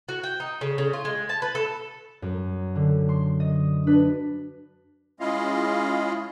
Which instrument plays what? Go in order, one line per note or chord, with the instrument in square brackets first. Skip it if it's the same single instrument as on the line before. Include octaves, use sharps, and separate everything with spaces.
[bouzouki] F#4
G5
D#4
C#3
C#3
F4
G#3
A5
B4
A4
[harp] F#2
D3
C6
D#5
[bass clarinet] D4 [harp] B4
[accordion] G#3 C#4 E4 F4 D#5 F5